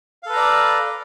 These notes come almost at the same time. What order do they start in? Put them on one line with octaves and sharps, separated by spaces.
F5 A4 B4 A#5 D5